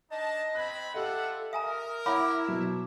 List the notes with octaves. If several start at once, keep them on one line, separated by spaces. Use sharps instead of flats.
D4 D#4 D#5 A5
C4 B5 F#6 G#6
F4 G4 A4 D#5 E5 F#5
A#4 E5 G#5 A#5 D#6
E4 C#5 E5 F#5 A#5 B5 D6
B2 F#3 E7